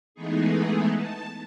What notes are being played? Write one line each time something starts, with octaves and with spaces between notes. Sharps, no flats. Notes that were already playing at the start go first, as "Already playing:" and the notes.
E3 G#3 A3 B3 D#4 G#4
A5